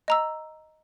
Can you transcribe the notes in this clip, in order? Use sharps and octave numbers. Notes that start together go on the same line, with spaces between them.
D#5 A#5 E6